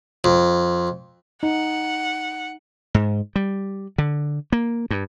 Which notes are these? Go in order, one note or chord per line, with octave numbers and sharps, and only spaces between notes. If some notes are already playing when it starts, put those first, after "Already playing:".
F2
D#4 F#5
G#2
G3
D3
A#3
G2